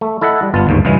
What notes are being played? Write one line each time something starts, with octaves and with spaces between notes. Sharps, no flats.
A3
E4 A4 D#5 E5 F#5
G3
G1 B3 F4 A5
G1 D#2 G#2
C#2 G2 C#3 E3 G#3